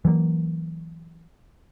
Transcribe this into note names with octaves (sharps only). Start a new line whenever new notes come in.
E3 F#3 G#3 A#3